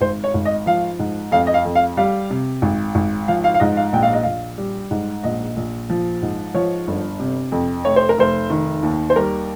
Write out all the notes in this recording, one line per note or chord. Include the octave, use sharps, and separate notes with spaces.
G#1 C5
C#5
G#1
D#5
F3 F5
G#2
F2 F5
D#5
F5
F2
F5
G3 F5
C3
G#1
G#1
F3 F5
F5
F5
G#2 D#5
F5
A#1 G5
F5
D#5
A#1 F5
G3
G#2
A#1 D#5
A#1
F3
G#2
F3 C#5
G1
C3
F2
F1 C#5
C5
A#4
F1 C5
D#3
D#2
C5
G3 A#4